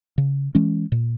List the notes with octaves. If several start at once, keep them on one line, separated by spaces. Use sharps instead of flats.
C#3
E3 G#3 C#4
A#2